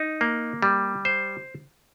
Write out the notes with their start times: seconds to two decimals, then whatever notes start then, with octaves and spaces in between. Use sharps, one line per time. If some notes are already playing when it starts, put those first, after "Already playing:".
Already playing: D#4
0.21 A#3
0.62 G3
1.05 C5